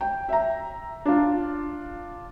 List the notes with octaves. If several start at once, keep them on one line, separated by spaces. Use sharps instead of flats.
G5
E5 A#5
D4 F4